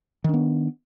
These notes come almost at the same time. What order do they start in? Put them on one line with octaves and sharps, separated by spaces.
D#3 D4 B3